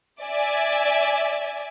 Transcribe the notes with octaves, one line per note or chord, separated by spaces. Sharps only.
D5 E5 G#5